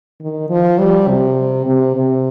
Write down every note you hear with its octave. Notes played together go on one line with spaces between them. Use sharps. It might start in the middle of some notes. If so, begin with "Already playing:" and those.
D#3
F3
G3
C3
C3
C3